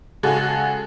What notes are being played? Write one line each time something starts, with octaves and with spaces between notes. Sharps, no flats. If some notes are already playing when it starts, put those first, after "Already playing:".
C#3 G#3 F#4 G#4 A4